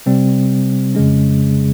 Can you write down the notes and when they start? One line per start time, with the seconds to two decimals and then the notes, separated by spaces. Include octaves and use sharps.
0.06 C3 G3 C4
0.95 F2 C#3 G#3 C#4